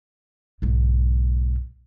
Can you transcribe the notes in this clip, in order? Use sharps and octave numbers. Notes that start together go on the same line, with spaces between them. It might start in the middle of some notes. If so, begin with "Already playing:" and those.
B1 G#2